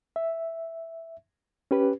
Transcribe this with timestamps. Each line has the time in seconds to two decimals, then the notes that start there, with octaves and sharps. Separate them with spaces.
0.16 E5
1.71 C#4 G4 B4